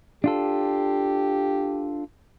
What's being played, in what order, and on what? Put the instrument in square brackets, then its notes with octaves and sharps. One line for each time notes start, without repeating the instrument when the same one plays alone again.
[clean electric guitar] D4 F4 A4 [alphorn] G4